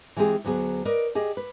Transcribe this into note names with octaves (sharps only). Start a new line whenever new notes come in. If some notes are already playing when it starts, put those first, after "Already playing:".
E3 G#3 C4 G4 G#4
D2 F#3 B3 G#4
A#4 B4 D5 D#5
G4 G#4 D#5
B4